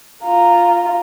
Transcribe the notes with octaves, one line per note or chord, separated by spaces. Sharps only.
F4 A#5